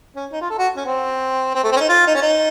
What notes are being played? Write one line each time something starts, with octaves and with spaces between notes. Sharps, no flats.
C#4
D#4
F4
A4
F#4
C#4
C4
C4
A3
C4
C#4
D#4
F4
D#4
C#4
D#4